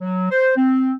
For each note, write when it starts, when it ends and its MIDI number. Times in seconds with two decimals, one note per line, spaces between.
0.01 0.26 54
0.30 0.54 72
0.56 0.92 60